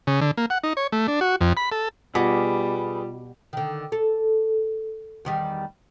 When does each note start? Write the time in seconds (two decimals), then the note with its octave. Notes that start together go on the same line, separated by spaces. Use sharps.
0.07 C#3
0.21 D3
0.37 A#3
0.50 F#5
0.63 D#4
0.77 C#5
0.92 A3
1.08 D4
1.21 F#4
1.41 F2
1.57 B5
1.72 A4
2.15 B2 G3 F4 G#4 B4 D6
3.53 D3 D#3
3.92 A4
5.25 E2 D#3 G3